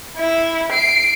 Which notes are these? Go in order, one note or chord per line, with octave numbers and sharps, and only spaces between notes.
E4
C7 D7